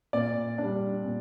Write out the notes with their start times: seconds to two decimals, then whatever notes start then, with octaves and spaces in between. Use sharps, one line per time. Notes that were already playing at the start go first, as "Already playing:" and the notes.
0.13 A#2 D5
0.58 G3 D4
1.04 A#2